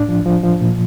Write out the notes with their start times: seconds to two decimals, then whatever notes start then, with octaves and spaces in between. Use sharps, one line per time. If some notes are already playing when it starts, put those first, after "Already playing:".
Already playing: A2 D4
0.09 F3
0.26 F3
0.43 F3
0.61 A#2